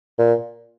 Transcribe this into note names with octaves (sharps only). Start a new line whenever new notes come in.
A#2